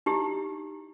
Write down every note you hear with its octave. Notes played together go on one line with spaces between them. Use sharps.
D#4 E4 G4